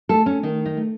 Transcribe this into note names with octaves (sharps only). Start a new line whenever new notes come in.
A3 A4
C#4
D#3 D#4
D#4
A3